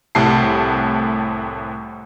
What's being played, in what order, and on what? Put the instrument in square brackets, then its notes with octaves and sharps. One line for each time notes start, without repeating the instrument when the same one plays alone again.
[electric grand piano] C2 A2 C3 A5 C7